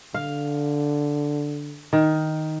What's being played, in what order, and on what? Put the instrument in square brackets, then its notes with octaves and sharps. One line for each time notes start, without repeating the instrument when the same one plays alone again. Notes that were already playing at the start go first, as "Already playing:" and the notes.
[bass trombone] D3 [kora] F5
[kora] D#3